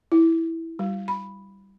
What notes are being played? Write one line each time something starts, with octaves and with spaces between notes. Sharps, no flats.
E4
G3
B5